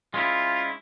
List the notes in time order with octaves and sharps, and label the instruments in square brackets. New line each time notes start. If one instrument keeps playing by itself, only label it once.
[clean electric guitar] G#3 C#4 E4 [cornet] F4